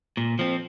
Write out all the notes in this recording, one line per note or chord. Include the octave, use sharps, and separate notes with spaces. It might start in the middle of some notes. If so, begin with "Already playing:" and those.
A#2
F3 C4